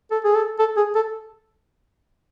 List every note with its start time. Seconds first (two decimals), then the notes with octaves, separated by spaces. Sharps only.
0.11 A4
0.24 G#4
0.35 A4
0.59 A4
0.77 G#4
0.95 A4